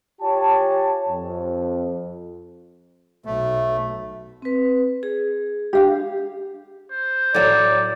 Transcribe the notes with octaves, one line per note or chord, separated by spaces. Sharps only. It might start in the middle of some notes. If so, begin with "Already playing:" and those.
F4 G4 C#5 G#5 A5
F2
B1 A3
C4 B4
G#4
D4 G4 F5
C5
A2 F#3 D5